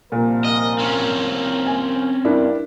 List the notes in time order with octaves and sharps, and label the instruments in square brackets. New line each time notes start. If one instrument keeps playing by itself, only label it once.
[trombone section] C2 F3 A#4 [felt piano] A#2
[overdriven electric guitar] D#5
C4 C#4
[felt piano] G#5
[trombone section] G2 [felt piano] D4 E4 A#4